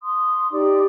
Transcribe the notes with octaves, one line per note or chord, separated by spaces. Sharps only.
C6 D#6
D#4 G4 D5 D6